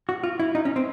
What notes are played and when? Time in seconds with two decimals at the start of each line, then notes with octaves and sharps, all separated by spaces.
0.09 F#4
0.23 F4
0.39 E4
0.55 D#4
0.65 C#4
0.76 C4